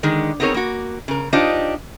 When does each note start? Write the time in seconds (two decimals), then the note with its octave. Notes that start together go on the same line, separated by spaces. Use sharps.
0.03 D3 D#3 G#3
0.40 B3 C4 D#4 G#4 A#4 C#5
0.54 A#3 F#4
1.08 C#3 A#4
1.33 D4 D#4 F4 G4 C5 D#5